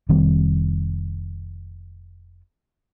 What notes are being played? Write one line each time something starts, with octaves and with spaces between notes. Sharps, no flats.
F1 D#3 G3 C4